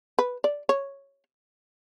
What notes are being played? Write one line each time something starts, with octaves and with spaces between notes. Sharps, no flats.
B4
D5
C#5